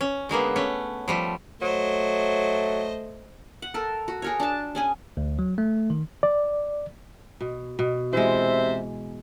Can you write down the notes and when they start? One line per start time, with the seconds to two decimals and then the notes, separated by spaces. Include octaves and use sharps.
0.01 C#4
0.29 D3 G#3 A#3 B3
0.56 A3 C#4
1.08 F3 G3 A3
1.62 F#3 A3 C5 D#5
3.62 F#5
3.74 A4 A#4
4.08 F#4
4.22 G#4 A#4 C#5
4.40 D4 A5
4.75 C#4 G#4 G#5
5.17 D2
5.39 F#3
5.58 A3
5.90 D#3
6.23 D5
7.41 B2
7.79 B2
8.13 C3 E3 G#3 C5 E5